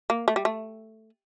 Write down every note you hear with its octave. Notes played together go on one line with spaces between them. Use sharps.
A#3
A3
G3
A3